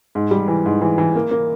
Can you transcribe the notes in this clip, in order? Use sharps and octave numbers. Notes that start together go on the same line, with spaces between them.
G#2
G3
E3
G#2
E3
E3
A#3
A#3